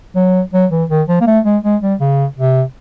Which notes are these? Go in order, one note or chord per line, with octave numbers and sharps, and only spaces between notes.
F#3
F#3
E3
D#3
F3
A#3
A3
G#3
G#3
G3
C#3
C3